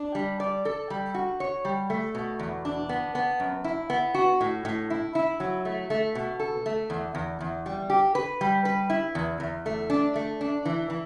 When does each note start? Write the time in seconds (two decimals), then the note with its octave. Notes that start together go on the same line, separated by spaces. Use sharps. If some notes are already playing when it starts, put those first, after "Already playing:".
Already playing: D4
0.15 G3
0.40 D5
0.65 A4
0.90 G3
1.14 F#4
1.40 C#5
1.65 G3
1.90 A3
2.15 B2
2.40 E2
2.65 D4
2.89 B3
3.15 B3
3.40 F#2
3.64 E4
3.90 B3
4.14 F#4
4.41 A2
4.65 A2
4.90 E4
5.15 E4
5.40 F#3
5.65 A3
5.90 A3
6.15 B2
6.40 A4
6.66 A3
6.90 E2
7.15 E2
7.41 E2
7.66 G3
7.90 G4
8.15 B4
8.41 G3
8.65 B4
8.90 E4
9.15 E2
9.40 E2
9.66 A3
9.90 D4
10.16 A3
10.41 D4
10.65 E3
10.90 E3